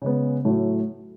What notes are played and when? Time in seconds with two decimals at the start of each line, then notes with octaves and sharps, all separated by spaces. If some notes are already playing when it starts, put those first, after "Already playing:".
0.02 C#3 G#3 B3
0.45 A2 F#3 A3